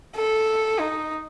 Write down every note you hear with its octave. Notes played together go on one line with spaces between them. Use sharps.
A4
D#4